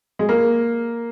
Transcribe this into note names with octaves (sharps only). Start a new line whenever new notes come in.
G#3
A#3